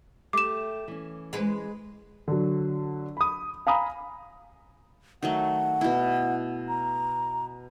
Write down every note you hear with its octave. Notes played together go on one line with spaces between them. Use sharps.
A3 G4 D6 E7
E3 C#4
G#3 B4
D3 F#3
B5 D#6
F5 G#5 A#5 B5 D#6
D#3 F#3 A3 F#5
B2 E4
A#5